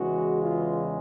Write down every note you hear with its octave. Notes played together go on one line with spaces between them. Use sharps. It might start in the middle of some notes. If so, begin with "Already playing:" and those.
Already playing: E2 C#3 E3 G#3 F#4
F4